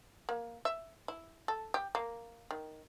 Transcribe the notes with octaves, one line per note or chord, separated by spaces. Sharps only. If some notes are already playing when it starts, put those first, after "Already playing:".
A#3
E5
E4
A4
G4
A#3
D#3